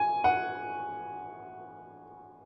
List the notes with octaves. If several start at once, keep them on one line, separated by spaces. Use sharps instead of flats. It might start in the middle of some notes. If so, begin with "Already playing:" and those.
Already playing: G#5
F#5